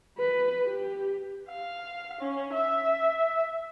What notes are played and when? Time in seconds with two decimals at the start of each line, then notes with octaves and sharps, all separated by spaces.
0.18 B4
0.65 G4
1.49 F5
2.21 C#4
2.53 E5